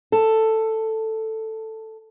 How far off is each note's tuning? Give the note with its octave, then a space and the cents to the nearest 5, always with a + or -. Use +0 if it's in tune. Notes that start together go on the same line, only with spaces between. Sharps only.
A4 +5